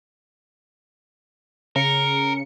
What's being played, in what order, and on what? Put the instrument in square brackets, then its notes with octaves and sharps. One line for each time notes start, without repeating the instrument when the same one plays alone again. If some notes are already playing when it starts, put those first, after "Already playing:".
[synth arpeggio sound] C#3 C#7 [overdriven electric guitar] A#4